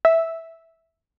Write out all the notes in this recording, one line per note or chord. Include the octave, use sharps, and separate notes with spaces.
E5